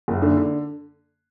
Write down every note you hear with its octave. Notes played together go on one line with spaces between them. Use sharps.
F#1
D3
D3